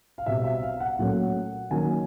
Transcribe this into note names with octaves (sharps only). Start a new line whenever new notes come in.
F5
B2 G3 C4 E5
E5
F5
F#5
A#2 F#3 A3 C#4
D#3 F#3 A#3 C#4 G#5